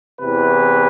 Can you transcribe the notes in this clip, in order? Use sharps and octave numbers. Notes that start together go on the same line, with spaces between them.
E2 C3 E3 B4